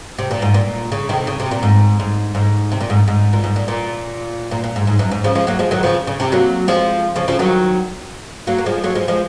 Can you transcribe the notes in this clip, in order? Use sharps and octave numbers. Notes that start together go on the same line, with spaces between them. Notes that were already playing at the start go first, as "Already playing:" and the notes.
C3
A#2
G#2
A#2
C#3
C3 D#3
C#3
C3
A#2
G#2
G#2
G#2
C3
A#2
G#2
G#2
A#2
G#2
A#2
A#2
A#2
A#2
G#2
G#2
F#2
G#2
C#3 F3
F3 G#3
F#3 A#3
F3 G#3
D#3 F#3
C#3 F3
C#3
C3
F#3 A#3
F3 G#3
C#3 F3
C#3 F3
D#3 F#3
F#3 A#3
A#3
F3 G#3
F#3 A#3
F3 G#3
F3 G#3